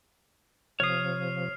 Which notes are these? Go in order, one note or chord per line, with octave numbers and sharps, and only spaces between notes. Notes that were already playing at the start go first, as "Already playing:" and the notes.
C3 F3 C#5 D#6 F6 C7